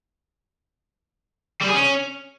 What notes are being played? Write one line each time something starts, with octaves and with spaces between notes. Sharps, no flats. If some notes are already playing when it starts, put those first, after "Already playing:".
G3
G#4
C#4